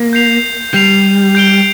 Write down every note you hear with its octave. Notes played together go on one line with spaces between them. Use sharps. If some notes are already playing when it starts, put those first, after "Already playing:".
Already playing: A#3
G6 C7 F7
G3 G6 C7 F7
G6 D7 G7